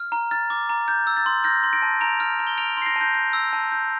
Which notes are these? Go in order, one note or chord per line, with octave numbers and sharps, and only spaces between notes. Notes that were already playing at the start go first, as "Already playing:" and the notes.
Already playing: F6
A#5
F6 A6
D6
A#5
G6
E6
A6
C6
F6 G6 A#6
C6
A#6 D7
A5
A#5 D7 F7
F6
A#5
G7
F6 D7 F7
C6 C7
A#6 D7
A5
G6 A#6
G6
E6
A5
G6